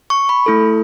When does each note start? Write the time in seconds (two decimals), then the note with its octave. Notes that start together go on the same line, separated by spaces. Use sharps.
0.10 C#6
0.29 B5
0.46 A3 E4 A4